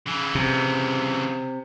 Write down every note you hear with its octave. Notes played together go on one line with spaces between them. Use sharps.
C#3 E3
C3